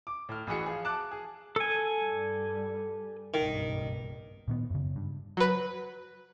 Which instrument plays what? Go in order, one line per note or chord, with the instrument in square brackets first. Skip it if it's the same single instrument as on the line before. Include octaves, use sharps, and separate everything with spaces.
[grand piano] D6
A2 F6
A1 E3 F#4 G#4 C#7
F3 G#4
A5 D6 F#6
G#4
[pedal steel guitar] A4 G#5
[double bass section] G2 G3
[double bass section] F#1 B1 G2 [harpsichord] D#3
[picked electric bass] A#2 D#3 B3
F#2 C#3
G2
[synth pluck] F#3 B4